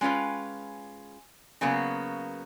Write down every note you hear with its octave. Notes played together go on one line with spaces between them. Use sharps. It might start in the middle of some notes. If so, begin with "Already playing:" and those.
G#3 C#4 F4 B4 G5
C#3 F#3 A#3 B3